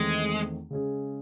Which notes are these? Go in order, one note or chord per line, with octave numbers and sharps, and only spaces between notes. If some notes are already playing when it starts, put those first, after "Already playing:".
Already playing: E2 D#3 G#3 A3 C4
C#3 G#3 C#4 G#4